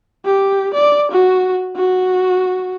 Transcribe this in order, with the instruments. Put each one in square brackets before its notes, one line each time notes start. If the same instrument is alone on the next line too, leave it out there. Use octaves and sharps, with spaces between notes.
[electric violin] G4
D5
F#4
F#4